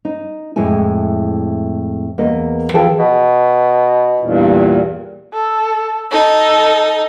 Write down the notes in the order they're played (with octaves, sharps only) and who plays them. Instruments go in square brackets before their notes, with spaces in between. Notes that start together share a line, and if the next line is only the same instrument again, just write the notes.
[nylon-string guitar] D#4
F2 A2 G#3 E4 G#5
E2 A#3 D#5
E3 F3 G#4 A4 G5 A5
[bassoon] B2
[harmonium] E2 G2 A#2
[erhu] A4
[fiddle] D#4 [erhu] A4